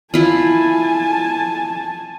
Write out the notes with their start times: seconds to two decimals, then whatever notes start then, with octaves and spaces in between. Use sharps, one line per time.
0.14 E4 F4 G#5 A5